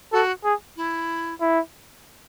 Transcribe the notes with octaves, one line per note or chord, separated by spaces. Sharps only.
F#4 A4
G#4
E4
E4